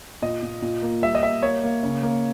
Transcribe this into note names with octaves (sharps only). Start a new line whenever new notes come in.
A#2 D#5
A#2
A#2
A#3
G3 E5
D#5
A#3 E5
A#3 C#5
A#3
C#3
A#3